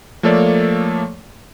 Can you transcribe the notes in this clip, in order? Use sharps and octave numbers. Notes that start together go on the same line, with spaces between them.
F3 A3 A#3 A4 C#5 D5